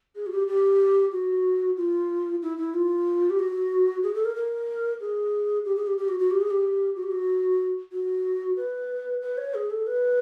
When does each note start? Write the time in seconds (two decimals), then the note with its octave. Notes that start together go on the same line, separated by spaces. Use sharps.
0.16 G#4
0.26 F#4
0.32 G4
0.47 G4
1.12 F#4
1.77 F4
2.42 E4
2.58 E4
2.74 F4
3.30 G4
3.39 F#4
4.03 G#4
4.15 A4
4.25 A#4
4.36 A#4
5.01 G#4
5.65 G4
5.76 G#4
5.87 G4
5.98 G4
6.09 F#4
6.19 F#4
6.31 G4
6.41 G#4
6.51 G4
6.96 F#4
7.03 G4
7.11 F#4
7.92 F#4
8.57 B4
9.22 B4
9.38 C#5
9.54 G#4
9.71 A4
9.87 B4